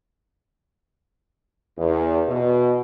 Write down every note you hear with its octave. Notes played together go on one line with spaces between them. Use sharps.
E2
B2